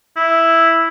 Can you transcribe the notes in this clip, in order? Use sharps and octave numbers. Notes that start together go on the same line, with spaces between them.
E4